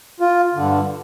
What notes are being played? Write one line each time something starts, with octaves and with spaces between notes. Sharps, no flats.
F4
G2 D3